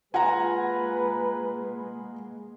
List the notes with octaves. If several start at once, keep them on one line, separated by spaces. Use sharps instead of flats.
G#3 A#3 F4 B4 F#5 G#5 A#5